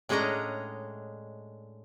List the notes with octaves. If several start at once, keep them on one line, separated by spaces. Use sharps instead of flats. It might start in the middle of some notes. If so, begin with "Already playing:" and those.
A2 G#3 C#4 D4 D#5 A#5